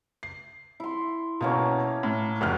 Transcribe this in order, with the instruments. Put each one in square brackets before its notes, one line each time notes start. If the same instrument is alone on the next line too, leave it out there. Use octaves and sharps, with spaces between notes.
[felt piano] C7
[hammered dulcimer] E4 C6
[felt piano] B2 [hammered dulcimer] A3 A#3 C#4
[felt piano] A2
[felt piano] F1 D2 F6 [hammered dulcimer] F#4